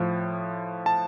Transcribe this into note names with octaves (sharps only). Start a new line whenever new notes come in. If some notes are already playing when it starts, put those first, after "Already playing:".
Already playing: A2 F3
A5